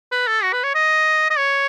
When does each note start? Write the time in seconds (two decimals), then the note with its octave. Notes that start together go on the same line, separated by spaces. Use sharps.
0.11 B4
0.27 A4
0.43 F#4
0.53 B4
0.64 C#5
0.75 D#5
1.30 D#5
1.38 C#5